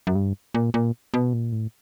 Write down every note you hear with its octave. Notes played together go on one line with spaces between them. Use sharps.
F#2
G2
A#2
A#2
B2
A#2
A2